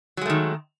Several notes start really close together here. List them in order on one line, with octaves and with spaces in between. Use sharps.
F#3 G#3 A3 D#3